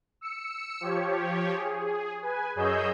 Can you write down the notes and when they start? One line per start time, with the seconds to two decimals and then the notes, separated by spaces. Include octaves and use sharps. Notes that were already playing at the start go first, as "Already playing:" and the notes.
0.21 E6 C#7
0.81 F3 G4 C#5
1.56 G#4
2.22 B4 G#5
2.55 F#2 G#4 C#5 D#5 E6 G6